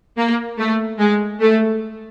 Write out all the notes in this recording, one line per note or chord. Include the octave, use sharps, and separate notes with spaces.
A#3
A3
G#3
A3